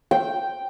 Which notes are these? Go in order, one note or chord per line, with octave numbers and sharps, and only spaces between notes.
G5